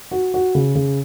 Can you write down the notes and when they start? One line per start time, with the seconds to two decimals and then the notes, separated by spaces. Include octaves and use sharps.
0.11 F#4
0.34 F#4
0.55 C#3
0.75 C#3